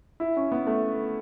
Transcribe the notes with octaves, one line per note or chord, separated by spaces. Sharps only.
E4
C#4
B3
A3